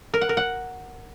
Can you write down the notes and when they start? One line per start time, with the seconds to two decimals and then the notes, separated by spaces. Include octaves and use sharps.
0.14 A#4
0.21 F#5
0.29 A#4
0.37 F#5